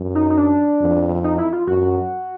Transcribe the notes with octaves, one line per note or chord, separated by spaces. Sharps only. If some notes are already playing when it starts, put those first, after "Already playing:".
Already playing: F#2
D#4
D#4
D4
F2
D#4
E4
F4
F#2 F#4